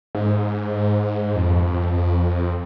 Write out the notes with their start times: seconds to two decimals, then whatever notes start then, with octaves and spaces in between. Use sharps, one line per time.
0.15 G#2
1.36 F2